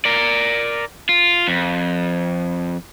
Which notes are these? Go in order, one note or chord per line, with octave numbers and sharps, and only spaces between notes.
A#4 D5
F4
F2